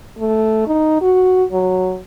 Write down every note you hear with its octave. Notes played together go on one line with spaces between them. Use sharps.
A3
D#4
F#4
F#3